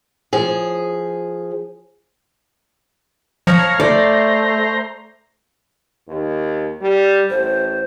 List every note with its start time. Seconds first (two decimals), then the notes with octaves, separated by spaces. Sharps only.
0.33 F3 G#4
3.47 F3 C#5 F5 A#5
3.80 A3 C5 D5 A#5
6.08 D#2
6.81 G3
7.30 A1 C5